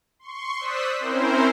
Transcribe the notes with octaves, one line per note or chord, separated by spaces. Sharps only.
C6 C#6
C5 D5 D#6 E6 F#6 B6
C4 C#4 E4 A#4 C5